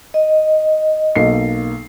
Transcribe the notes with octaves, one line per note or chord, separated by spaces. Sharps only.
D#5
B1 A#3 C7